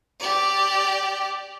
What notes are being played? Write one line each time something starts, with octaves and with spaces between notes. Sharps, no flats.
G4 D5